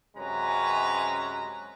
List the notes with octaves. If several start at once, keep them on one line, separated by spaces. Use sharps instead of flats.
F#2 C3 G#3 C#4 B4 A#5